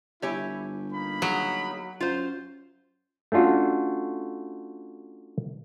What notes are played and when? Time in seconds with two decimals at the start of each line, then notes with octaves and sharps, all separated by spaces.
0.22 G1 E4 G4 C#5 G#5
0.93 A#3 D#4 B5
1.22 F#3 G#4
2.00 F#2 F4 C5
3.32 A3 C#4 D4 F4 F#4